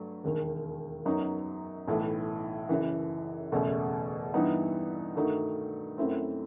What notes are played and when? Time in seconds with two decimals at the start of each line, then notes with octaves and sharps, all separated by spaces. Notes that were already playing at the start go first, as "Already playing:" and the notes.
Already playing: G2 F#3 A3
0.24 E1 D#2 D#3
1.05 F#2 F#3 B3 D#4
1.88 B1 A2 E3
2.69 F#1 F#2 E3
3.52 F#1 E2 B2 A3
4.34 G2 E3 G3 B3 D#4
5.16 G2 D#3 A3 D#4 F#4
5.98 F#2 F#3 A3 C4 E4